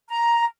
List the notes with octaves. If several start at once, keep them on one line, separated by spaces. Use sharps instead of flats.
A#5